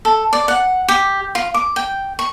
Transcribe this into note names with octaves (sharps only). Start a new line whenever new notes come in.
A4
D5
F#5
G4
F4
D6
G5
C#6